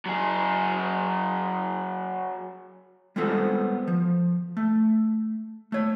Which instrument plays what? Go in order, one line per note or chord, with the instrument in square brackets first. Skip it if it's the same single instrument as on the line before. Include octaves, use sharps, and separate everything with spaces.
[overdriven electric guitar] F#3 G#4
[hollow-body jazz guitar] G3 G#3 B3 C4 F4 A4
F3
A3
A3 C#5